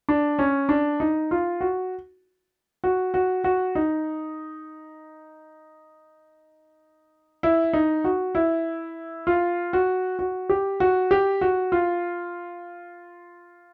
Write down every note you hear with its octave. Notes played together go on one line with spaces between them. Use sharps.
D4
C#4
D4
D#4
F4
F#4
F#4
F#4
F#4
D#4
E4
D#4
F#4
E4
F4
F#4
F#4
G4
F#4
G4
F#4
F4